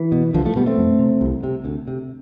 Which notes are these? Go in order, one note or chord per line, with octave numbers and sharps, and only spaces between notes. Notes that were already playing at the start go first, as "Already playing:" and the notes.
Already playing: E3
B2
C2 D3 F3
F3 A3
B2 G3 B3
A3 C4
F2
C3
C2
C3
D2
C3